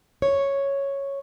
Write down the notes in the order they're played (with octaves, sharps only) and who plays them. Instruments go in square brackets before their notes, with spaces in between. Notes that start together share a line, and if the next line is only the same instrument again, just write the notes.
[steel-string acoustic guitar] C#5